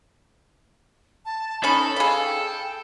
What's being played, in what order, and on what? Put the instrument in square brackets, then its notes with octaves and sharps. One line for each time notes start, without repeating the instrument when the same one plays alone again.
[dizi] A5
[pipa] C#4 B5 [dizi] D#4 [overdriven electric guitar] A4
[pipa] G#4 B5 [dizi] F5
[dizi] G5